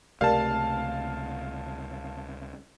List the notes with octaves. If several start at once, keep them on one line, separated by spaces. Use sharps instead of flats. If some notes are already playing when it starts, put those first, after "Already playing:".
C#2 C3 A3 G4 A#4 D5 F5 A5